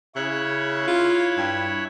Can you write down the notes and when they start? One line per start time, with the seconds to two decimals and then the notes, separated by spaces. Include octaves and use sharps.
0.15 C#3 E4 C#5 F#6
0.87 F4
1.37 G2